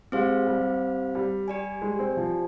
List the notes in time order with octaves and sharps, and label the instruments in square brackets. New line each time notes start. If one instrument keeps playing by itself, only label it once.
[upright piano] G#3 [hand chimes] C4 G4 C5 F5
[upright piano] G3
G3
[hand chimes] G4 D5 G#5
[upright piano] G#3
C4
F3